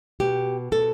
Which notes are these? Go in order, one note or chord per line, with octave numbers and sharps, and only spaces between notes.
B2 G4
B2 A4